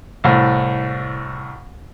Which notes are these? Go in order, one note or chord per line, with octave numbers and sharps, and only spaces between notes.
C2 A2